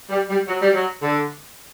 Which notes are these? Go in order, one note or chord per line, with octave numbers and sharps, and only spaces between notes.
G3
G3
F#3
G3
F#3
D3